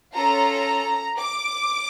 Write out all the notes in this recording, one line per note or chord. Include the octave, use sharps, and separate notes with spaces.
C#4 F4 A4 A#5
D6